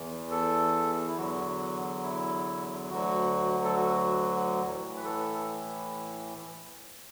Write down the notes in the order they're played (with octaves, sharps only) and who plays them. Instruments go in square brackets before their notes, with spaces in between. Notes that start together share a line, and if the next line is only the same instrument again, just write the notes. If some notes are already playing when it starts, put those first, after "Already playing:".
Already playing: [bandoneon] E2 E3
A4
E4
E2 D3 F#3 F#4
E4
D2 D3 F#3 F#4
A4
F#4
A2 E3 F#4
B4
A4